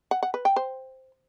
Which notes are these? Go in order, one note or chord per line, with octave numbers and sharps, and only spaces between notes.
F#5
F#5
B4
G5
C5